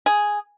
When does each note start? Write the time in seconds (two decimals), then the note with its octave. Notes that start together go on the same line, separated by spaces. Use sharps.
0.06 G#4